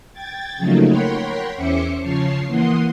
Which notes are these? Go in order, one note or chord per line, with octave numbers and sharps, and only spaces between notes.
G5 G#6 A6
C#3 F3 F#3 A3 A#3 D#4
A#4 C#5 F#5 G5 B5 C6
E2 C#4 C5 E5 D6 C#7
C#3 F3 C#5 A5 C7
E3 A#3 F#5 C6 D#6